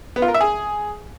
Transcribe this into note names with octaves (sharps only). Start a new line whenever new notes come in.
B3
F4
A#4
E5
G#4